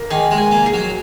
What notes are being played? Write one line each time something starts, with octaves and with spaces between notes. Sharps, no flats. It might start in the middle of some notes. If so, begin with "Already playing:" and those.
Already playing: A#3
D#3 G#4
G#3
G#5
A#3
G#4
F#3